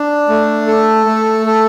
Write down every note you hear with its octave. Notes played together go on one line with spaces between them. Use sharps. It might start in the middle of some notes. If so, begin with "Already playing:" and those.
Already playing: D4
A3
A4
A3
A4